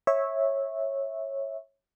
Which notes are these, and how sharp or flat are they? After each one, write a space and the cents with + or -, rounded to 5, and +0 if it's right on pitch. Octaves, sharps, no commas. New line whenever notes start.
C#5 -15 E5 -10